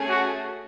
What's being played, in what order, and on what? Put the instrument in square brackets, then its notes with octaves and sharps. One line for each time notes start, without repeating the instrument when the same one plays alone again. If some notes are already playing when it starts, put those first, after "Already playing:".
Already playing: [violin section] A3 C#4 G#4
[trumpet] F#4